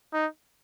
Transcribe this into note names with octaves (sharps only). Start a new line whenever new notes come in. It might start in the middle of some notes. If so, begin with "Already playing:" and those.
D#4